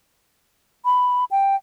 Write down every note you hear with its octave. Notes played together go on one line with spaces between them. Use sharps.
B5
G5